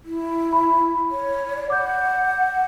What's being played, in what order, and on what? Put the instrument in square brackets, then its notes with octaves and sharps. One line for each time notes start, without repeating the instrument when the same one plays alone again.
[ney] E4
[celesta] B5
[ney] C#5
D5
[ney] F#5 [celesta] D6 G6